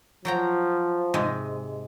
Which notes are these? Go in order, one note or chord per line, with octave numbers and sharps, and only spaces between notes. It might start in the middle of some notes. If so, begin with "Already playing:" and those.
F3 F#3 G5 A#5
G#2 C3 G#3